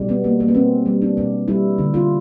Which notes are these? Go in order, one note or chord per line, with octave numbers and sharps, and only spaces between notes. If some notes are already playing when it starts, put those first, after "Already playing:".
Already playing: B2 G3
B3
A#3
A#3
B3
B2 C4
G3
D4
B2
G3 E4
D3
F4